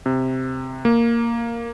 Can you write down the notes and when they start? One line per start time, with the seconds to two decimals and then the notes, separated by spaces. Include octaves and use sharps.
0.06 C3
0.85 A#3